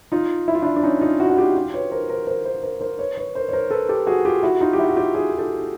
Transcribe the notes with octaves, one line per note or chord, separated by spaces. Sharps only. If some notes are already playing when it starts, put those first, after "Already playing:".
D#4 F4
E4
F4
D4 E4
D4
C#4 D#4
D#4 F4
E4 F#4
F#4
F4 G4
F4 G4
B4 C#5
A#4 C5
A#4 C5
A#4 C5
A#4 C5
A#4 C5
A#4 C5
B4 C#5
B4 C#5
A#4 C5
C#5
A#4 C5
A4 B4
G4 A4
F#4 G#4
F4 G4
E4 F#4
D#4 F4
G4
E4 F#4
F#4
F4 G4
F#4 G#4
G#4
G4 A4